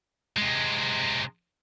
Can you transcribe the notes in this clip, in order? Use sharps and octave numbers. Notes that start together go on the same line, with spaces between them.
C3 G#3